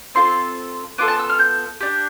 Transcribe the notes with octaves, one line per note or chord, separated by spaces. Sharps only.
C4 F4 A4 C6
B3 F4 A4 D6
A5
E6
F6
G6
D4 G4